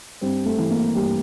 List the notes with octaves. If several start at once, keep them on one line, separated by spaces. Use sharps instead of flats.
G2 C4
A3
E3
A#3
G2 G4